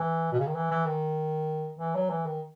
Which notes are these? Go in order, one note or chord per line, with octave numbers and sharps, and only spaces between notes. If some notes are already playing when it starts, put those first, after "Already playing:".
Already playing: E3
B2
C#3
D#3
E3
E3
D#3
E3
F#3
E3
D#3